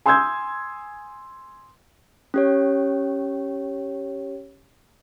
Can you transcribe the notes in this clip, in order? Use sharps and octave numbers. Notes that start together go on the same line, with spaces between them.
G#5 C6 D#6 E6 G6 G#6
C#4 G4 C#5